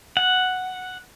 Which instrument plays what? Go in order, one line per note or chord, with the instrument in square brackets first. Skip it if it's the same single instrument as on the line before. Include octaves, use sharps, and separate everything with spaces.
[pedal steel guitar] F#5